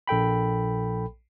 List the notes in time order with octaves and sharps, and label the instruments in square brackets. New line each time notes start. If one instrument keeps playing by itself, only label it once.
[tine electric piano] A#1 A4 G5 B5